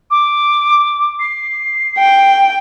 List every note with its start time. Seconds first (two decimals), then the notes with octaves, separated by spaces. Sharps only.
0.11 D6
1.20 C7
1.99 G5